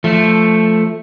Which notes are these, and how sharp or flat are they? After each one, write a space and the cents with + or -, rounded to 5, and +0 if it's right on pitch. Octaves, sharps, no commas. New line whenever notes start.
F3 +0 A3 +0